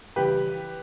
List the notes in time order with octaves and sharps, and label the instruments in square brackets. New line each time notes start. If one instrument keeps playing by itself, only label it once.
[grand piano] C#3 E3 G3 G4 B4